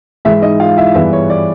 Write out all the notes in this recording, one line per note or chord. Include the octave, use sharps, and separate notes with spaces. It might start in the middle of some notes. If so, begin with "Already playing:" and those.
G#2 E3 G#3 E4 E5
D#4 D#5
F4 F5
E4 E5
G2 E3 G#3 B3 E4 E5
C#5
D5